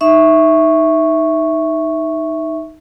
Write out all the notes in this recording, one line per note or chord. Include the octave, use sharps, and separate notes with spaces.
D#4 E5 C#6